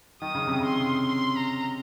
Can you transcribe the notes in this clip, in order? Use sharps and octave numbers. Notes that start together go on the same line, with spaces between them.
D#3 D#6
C#3
C3
C#3
C6
C6
A#5